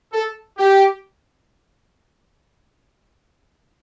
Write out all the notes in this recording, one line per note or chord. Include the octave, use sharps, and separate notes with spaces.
A4
G4